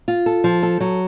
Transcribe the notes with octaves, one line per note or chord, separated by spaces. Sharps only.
F4
A4
F3
A4
F#3